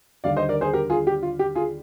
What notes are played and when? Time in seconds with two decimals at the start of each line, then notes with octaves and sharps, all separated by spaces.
0.24 D#2 D3 G3 D5 F5
0.36 C5 D#5
0.49 A#4 D5
0.61 G#4 C5
0.73 G4 A#4
0.90 F4 G#4
1.07 G4
1.23 F4
1.39 G4
1.55 F4 G#4